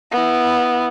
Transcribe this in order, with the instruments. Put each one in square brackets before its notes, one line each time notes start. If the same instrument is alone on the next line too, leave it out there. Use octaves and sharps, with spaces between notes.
[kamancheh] B3 E4